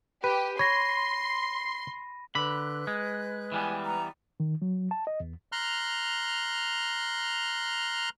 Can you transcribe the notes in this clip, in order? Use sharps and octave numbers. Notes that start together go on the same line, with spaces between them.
G4 B4 D#7
C#5 B5 C6 A#6
D3 B4 B5 F#6
G#3
E3 G3 B3 G#5
A#5
D#3
F#3
A5
D#5
E2
A#5 C6 F6 F#6